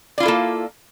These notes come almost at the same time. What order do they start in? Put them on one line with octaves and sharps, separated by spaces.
D5 F4 E4 A4 A#3